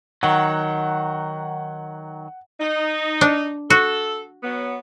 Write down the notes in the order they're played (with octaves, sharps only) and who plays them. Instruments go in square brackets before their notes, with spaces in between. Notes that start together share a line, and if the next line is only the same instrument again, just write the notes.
[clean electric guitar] D#3 F#3 [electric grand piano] F#5
[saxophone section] D#4
[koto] D4
[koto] F#4 [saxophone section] A4
[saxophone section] F#3 B3